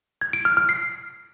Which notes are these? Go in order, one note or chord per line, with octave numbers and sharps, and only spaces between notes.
G#6
D7
F6
F6
C7